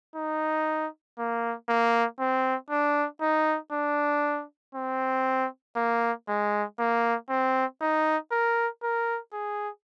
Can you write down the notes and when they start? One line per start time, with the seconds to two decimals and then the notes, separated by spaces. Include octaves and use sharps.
0.16 D#4
1.19 A#3
1.69 A#3
2.19 C4
2.70 D4
3.21 D#4
3.72 D4
4.75 C4
5.76 A#3
6.28 G#3
6.79 A#3
7.29 C4
7.81 D#4
8.32 A#4
8.83 A#4
9.33 G#4